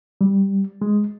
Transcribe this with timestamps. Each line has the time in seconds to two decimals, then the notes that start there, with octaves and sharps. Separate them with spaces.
0.21 G3
0.82 G#3